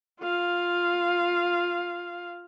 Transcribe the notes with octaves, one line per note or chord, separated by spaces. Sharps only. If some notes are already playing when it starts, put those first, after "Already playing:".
F4 F5